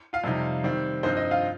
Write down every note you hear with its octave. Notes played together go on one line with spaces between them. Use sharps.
F4 F5
F2 C3 G3 D#4
D#3 G3 C4
G2 F3 C4 D#4 C5
D#4 D#5
F4 F5